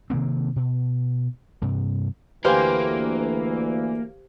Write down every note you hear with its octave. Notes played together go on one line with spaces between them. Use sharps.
C3 D#3 A#3 C4
B2
G2 C3
D2 E3 A#3 G4 B4 C5 F5 G#5